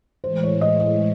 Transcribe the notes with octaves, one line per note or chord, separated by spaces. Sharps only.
A2 E3 G#3 C5
C#5
D#5
D#5